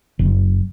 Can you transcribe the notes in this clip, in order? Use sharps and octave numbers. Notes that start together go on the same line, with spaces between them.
F#1